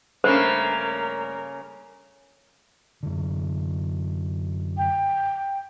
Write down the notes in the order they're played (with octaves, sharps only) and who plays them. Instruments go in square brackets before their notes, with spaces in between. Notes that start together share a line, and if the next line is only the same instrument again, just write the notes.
[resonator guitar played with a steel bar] G2 A3 C#4 [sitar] C#3 A#3 [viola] A#4 [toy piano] C5
[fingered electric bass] F#2 D3
[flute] G5